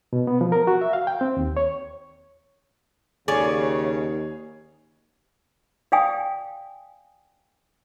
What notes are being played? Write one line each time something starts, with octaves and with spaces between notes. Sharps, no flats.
B2
B3
F3
A#4
F#4
E5
F5
G5
C4
D#2
C#5
D#2 C#3 G#4 C#5 D5 G#5
D5 F5 G5 G#5 D#6